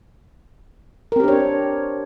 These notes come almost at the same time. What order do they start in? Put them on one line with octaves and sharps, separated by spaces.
A#4 C4 G4 D4 C#5